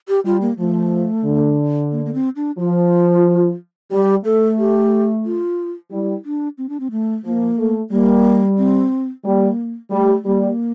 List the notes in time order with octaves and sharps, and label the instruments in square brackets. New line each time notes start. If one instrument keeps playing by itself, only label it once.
[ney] G4
[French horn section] G3 [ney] F4
[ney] A#3
[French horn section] F3 [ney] A3
[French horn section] D3
[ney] A#3
A#3
C4
D4
[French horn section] F3 [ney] F4
[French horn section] G3 [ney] G4
[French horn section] A3 [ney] A4
[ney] G4
F4
[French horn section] G3 [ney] E4
[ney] D4
C4
D4
C4
A3
[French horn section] F3 [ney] A#3
[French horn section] A3
[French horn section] G3 [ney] A#3
[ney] C4
[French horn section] G3 [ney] A#3
[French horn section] G3 [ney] A3
[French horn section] G3 [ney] A#3